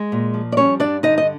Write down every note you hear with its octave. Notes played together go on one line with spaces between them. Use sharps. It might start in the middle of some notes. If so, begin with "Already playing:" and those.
Already playing: G#3
A#2
F3
D5
G3 C#4 C#5
G2 D4 D5
D3 D#4 D#5
D#5